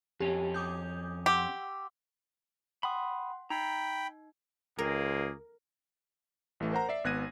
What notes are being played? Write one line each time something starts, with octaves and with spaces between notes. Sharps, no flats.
F2 C#4 G4
D6 D#6 G6
G4 F#5 C6 E6
F#5 G5 B5 C6 D#6
D#4 G5 A#5 B5
C#2 G#3 A#3 G#4 A#4
A1 E3 A3
A#4 C5 F#5 A#5
D5 E5 C7
G#1 B3 F#6 G#6 A#6 D#7